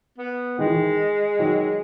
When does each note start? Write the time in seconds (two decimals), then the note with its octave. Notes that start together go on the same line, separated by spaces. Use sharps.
0.18 B3
0.59 D#3 G#3
0.66 E3
0.74 D#3
1.39 D#3 F#3